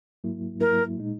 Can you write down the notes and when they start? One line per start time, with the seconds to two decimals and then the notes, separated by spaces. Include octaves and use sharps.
0.24 G#2 F#3 A#3 E4
0.60 G#2 F#3 A#3 E4 A#4
0.98 A#2 G#3 D#4